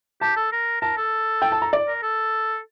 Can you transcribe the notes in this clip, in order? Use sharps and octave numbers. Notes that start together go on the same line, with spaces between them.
G4 A5
A4
A#4
A#4 A5
A4
G5
A5
A#5
D5
A#4
A4